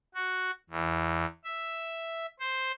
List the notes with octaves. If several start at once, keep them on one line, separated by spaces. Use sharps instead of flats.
F#4
E2
E5
C5